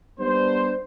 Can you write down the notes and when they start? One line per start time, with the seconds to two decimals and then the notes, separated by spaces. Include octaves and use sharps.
0.20 G3 B3 D4 C5